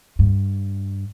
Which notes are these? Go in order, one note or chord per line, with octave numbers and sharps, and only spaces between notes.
G2